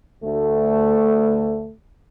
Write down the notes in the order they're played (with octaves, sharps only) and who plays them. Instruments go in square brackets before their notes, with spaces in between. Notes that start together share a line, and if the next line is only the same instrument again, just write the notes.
[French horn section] D2 A3